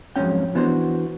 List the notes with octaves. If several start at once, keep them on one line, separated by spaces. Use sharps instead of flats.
F2 G#2 F3 F#3 C#4 G5
E3 B3 D4 F#4 C5